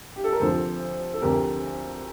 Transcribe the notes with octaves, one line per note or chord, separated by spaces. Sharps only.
G4
A4
A#4
D2 C3 F3 A4 C5
A4
D2 C3 F3 G4 A#4